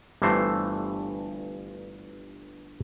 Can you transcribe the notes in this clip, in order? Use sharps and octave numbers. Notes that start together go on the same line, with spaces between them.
G1 G2 E3 A3 C5